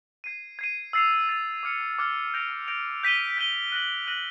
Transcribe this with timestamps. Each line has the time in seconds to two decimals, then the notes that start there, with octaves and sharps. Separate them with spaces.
0.24 G#6 C7 D#7
0.59 G#6 C7 D#7
0.93 E6 A6 C7 F7
1.29 E6 A6 C7 F7
1.63 D6 F6 G#6 C#7
1.99 D6 F6 G#6 C#7
2.34 G6 A#6 D7 F7
2.68 G6 A#6 D7 F7
3.03 G6 B6 D#7 G7
3.37 G6 B6 D#7 G7
3.72 F#6 A#6 D#7 F#7
4.07 F#6 A#6 D#7 F#7